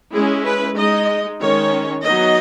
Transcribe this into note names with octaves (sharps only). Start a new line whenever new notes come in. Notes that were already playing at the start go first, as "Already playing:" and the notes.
G#3 C#4 E4 G#4
B4
G#3 D#4 D#5
D#3 G#3 C#4 C#5
F#3 B3 D#4 D#5